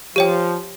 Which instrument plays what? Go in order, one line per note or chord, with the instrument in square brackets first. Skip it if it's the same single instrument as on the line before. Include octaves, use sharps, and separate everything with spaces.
[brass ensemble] F3 [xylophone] G4 C#5 G5